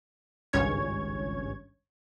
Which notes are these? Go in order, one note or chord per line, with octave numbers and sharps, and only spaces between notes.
G#1 C#2 G2 C#4 C#5 G#6